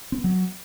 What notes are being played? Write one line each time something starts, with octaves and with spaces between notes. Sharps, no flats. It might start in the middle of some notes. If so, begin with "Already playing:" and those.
C4
B3
F#3